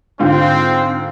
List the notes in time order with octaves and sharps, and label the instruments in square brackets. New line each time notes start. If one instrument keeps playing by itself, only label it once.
[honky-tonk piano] G#2 D3 F4 [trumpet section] C4